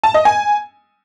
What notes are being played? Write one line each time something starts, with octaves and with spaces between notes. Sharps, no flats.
A5
D#5
G#5